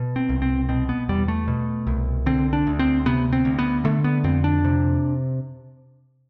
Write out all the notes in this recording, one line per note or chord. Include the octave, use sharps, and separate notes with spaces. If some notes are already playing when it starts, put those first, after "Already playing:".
Already playing: B2
C4
C2
C4
B2 C4
B3
E2 G3
A3
B2
C2
D3 C4
D4
D2
C4
C3 B3
C4
D2
B3
D3 A3
B3
F2 C4
D4
C3